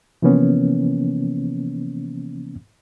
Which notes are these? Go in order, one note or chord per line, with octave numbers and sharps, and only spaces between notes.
C3 E3 F3 A#3 B3 C#4